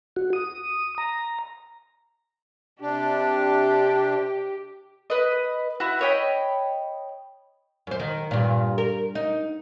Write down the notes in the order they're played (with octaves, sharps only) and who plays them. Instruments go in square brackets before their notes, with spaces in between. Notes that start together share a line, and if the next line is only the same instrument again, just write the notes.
[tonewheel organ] F#4
D#6
A#5
[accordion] C3 D4 [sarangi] G4
[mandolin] B4 D#5
E4 F#4
C#5 D#5 G5 B5
[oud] F#2 C5
D#3
G2 A#2
A#4
D#4